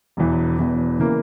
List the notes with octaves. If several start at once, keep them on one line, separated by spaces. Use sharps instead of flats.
E1 E2 E3
E1 E2 E3
C#3 E3 A#3